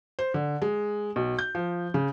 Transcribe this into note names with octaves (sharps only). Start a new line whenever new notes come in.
C5
D3
G#3
B1
G6
F3
C#3